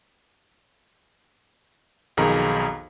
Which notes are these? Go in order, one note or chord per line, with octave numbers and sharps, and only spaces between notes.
B1 F2 D#3 G#4 A#5